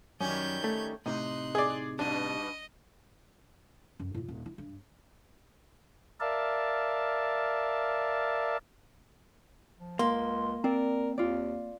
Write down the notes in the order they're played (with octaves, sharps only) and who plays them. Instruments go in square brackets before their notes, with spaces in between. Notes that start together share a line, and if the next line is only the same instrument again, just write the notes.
[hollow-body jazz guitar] F#2 [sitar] D#3 G3 C#4 [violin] G6 G#6
[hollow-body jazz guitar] A3
[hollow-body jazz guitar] A2 C3 [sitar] D#4 [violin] C6 F#6
[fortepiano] G#4 D5
[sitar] G2 B2 [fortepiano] D4 [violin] D#5
[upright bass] F#2
A2 F4
D#1
E4
G2
[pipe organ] A#4 D5 E5 F5 A5
[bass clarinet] F3
[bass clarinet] C#2 [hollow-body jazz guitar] A#3 [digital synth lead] C6
[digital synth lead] C4 [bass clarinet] A#4 [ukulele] D5
[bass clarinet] D#2 [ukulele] F4 D5